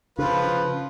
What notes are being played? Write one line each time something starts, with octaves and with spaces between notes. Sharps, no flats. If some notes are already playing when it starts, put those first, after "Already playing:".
C#3 F3 F4 B4